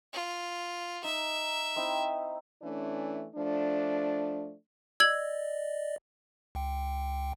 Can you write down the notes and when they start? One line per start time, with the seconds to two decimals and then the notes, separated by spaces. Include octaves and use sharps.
0.13 F4
1.04 D#4 E5
1.76 C4 D#4 E4
2.62 E3 A3 C#4 D4
3.35 F3 A3 D4
5.00 D5 D#5 E6 G#6 F#7
6.55 C#2 G5